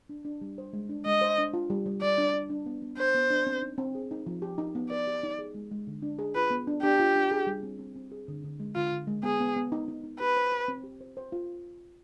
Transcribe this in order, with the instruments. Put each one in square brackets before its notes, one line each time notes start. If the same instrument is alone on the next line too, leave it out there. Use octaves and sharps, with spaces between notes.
[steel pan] D4
D4
G3
C5
G#3
D4
[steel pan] G#3 [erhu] D#5
[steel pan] C5
D4
F4
G3
G3
[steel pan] G3 [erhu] D5
[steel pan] D4
D4
D4
B3
B3
[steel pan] D4 [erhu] C5
[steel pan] B3
D4
C4
D#4
C4
G#4
D#4
F3
G4
D#4
B3
[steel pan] B4 [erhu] D5
[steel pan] G4
D#4
G#4
G#3
G#3
D3
D4
G#4
[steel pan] F4 [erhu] B4
[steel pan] B3
D4
[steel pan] D4 [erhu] G4
[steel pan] F4
D4
G#4
G3
C4
C4
C4
G#4
D3
D3
G#3
[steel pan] D3 [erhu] F4
[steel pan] D3
G#3
[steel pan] B3 [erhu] G#4
[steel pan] B3
B3
D#4
D#4
D#4
[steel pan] G4 [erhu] B4
[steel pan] C5
C5
C4
G4
C5
C5
F4